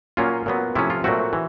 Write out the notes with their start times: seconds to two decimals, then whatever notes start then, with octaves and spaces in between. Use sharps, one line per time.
0.17 A#2 F#3 A#3 C#4 F4
0.46 A#2 F#3 B3
0.75 C3 F3 A3 C#4 E4
0.90 F4
1.04 A#2 F#3 A3 C4 F#4
1.33 E3